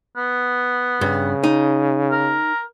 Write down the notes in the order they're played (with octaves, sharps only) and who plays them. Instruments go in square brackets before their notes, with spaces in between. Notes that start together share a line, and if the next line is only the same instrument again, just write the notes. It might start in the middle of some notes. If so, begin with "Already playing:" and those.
[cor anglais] B3
[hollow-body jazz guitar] G2 [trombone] C#3
[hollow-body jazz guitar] D#4
[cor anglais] A#4